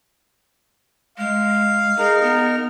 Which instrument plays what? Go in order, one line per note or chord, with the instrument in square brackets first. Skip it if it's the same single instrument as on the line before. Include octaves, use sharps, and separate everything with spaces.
[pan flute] G#3 [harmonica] F5
[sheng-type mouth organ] D#4 A#4 F6 [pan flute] G#4
[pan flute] B3